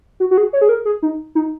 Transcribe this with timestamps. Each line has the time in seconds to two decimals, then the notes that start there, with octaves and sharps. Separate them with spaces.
0.20 F#4
0.31 F#4
0.38 G#4
0.53 C#5
0.61 G#4
0.69 A#4
0.85 G#4
1.03 D#4
1.35 D#4